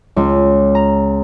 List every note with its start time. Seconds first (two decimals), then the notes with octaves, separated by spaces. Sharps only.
0.16 C#2
0.75 A#5